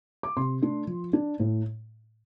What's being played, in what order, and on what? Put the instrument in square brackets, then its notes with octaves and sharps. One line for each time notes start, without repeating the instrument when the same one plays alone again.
[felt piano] D6
C3 C6
A3 D4
F3
D4
A2